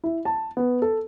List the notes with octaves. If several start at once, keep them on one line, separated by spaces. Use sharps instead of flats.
E4
A5
B3
A4